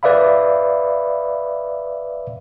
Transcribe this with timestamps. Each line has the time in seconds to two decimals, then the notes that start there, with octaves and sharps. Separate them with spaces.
0.03 B4 D5 E5 F5 B5